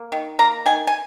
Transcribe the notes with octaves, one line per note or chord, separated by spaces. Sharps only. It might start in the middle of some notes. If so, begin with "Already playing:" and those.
Already playing: A#3
D#3
A#3 A#5
D#3 G#5
G#5